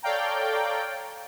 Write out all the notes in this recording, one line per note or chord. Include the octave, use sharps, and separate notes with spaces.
A4 C#5 D5 F5 G5 A#5